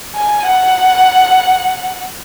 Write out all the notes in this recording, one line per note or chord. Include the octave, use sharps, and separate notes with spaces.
G#5
F#5